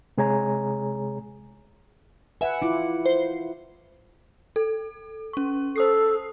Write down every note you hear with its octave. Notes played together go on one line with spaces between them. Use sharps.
C3 G#3 G#4 C#5 G#5 A#5
B4 E5 F#5 G#5
E4 F4 D6
C5
A4
C#4 C#6
A4 C5 D#6 C7